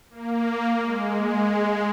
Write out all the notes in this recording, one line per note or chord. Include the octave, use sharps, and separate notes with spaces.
A#3
G#3